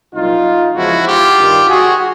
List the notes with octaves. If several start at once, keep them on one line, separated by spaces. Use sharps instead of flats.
C2 A#2 F#3 D#4 F4
E2 C#3 F3 G#3 E4 F#4
F4 G4
G2 D#3 G3
F#4 G#4